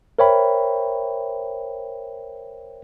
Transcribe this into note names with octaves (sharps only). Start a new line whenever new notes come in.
A#4 C5 C#5 E5 G5 B5